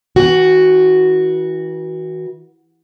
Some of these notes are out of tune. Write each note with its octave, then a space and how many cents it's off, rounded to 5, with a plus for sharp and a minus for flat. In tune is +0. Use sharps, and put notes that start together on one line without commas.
E3 -40 F#4 +0